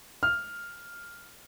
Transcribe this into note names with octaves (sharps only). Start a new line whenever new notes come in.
F6